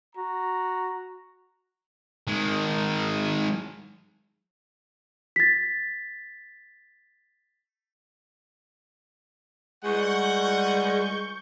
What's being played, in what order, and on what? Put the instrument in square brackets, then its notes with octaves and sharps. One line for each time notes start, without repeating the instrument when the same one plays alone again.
[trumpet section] F#4 A#5
[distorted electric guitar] D#3 G#3
[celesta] A6 B6
[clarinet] G3 [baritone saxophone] G#3 [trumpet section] F#5 [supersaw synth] C#6 G6